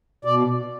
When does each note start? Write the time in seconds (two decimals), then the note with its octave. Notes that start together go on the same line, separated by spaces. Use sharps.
0.25 B2 D5